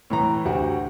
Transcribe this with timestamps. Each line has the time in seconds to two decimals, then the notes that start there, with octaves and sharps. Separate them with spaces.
0.10 A2 E3 A#5
0.45 D2 F#4 G4